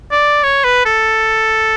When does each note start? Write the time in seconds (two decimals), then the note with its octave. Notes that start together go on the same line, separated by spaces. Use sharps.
0.12 D5
0.43 C#5
0.64 B4
0.86 A4